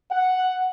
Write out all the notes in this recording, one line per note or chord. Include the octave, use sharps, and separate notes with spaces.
F#5